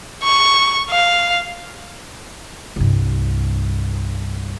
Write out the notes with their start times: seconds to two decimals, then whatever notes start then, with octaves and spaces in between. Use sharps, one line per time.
0.23 C#6
0.90 F5
2.76 C2 G2